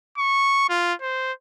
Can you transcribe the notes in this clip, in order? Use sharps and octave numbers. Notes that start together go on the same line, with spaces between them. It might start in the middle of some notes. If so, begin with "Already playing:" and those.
C#6
F4
C5